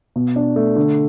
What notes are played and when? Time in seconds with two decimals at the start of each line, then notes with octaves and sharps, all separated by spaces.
0.16 B2
0.36 D4
0.56 A3
0.76 D3